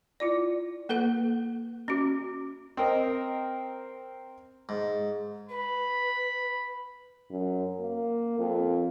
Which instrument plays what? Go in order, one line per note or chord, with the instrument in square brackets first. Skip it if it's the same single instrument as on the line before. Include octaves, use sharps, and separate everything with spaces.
[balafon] E4 F4 D5
A#3 A4 B4 F#5
C#4 F#4
[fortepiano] C4 A#4 D#5
[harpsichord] G#2
[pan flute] B4 [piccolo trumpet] B5
[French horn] F#2
A#3
F2